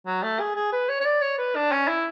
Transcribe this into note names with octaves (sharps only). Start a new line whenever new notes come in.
F#3
A3
G#4
G#4
B4
C#5
C#5
D5
C#5
B4
D4
C#4
E4